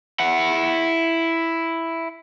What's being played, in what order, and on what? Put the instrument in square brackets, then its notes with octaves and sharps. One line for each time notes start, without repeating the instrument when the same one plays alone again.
[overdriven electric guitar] E4 F#5